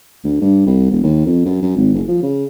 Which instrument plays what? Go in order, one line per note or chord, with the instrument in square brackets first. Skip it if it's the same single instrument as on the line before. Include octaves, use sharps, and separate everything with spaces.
[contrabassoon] D2
G2
C2
E1
D#2
F2
F#2
F#2
G#1
F#1
F3
C#3